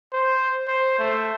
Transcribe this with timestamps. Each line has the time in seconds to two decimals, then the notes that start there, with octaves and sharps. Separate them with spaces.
0.12 C5
0.68 C5
0.99 A3